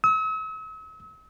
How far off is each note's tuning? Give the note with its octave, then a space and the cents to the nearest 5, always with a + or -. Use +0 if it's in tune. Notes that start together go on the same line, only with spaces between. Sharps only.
E6 -45